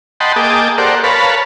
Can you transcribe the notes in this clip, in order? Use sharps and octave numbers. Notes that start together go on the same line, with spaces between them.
D#5 F#5 G5 A5 B5 C6
A#3 G#4 D#5 G5 A5 D6
G4 A4 A#4 C5 D5 F#5
A#4 B4 C#5 F5 A5 B5